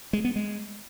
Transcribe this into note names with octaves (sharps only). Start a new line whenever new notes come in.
G#3
B3
G#3